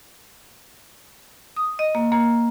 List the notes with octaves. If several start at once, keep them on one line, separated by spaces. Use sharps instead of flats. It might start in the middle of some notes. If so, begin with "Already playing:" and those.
D#6
D#5
A#3
A#3